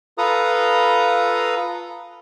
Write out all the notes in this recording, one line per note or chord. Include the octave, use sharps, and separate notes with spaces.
F4 A4 B4 A#5 D#6